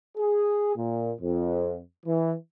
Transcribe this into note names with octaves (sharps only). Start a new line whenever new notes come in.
G#4
A#2
F2
E3